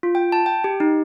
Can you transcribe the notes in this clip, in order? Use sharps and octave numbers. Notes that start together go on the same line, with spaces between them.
F4
G5
A5
G5
G4
D#4